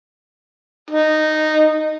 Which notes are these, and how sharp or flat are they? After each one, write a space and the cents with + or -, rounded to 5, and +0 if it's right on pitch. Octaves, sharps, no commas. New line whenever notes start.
D#4 -10